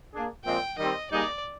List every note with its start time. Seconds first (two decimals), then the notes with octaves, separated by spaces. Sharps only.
0.13 A#3 D4 G#4
0.45 A#2 F3 G#3 C4 G5
0.78 D#3 G3 C4 D#5
1.11 G3 A#3 D#4 G#4 D5 D#5